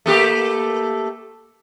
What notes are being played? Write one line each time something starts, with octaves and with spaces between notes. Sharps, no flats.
A3 A#3 G4